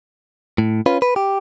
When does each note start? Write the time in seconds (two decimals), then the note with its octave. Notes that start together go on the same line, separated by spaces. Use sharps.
0.58 A2
0.86 C#4 F4 B4
1.02 B4
1.16 G4